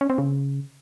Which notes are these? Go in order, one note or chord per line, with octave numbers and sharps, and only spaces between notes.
C#4
C4
C#3